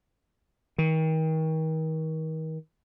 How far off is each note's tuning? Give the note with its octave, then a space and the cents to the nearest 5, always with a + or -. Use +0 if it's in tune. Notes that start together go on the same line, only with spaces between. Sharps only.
D#3 +35